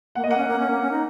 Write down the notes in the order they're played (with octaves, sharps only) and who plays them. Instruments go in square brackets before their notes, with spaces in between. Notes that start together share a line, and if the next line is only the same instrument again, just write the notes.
[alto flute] A#3 [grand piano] F#5
[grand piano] D#5
[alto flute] A#3 [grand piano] F#5
[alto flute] C#4
A#3
C#4
A#3
C#4
D#4